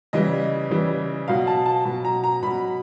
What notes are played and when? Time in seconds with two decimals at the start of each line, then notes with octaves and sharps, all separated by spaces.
0.13 C#3 E3 G3 D#5
0.70 C#3 E3 G3
1.28 B2 F#3 F5
1.47 A5
1.66 A5
1.85 B2 F#3
2.05 A#5
2.24 A#5
2.43 B2 F#3 B5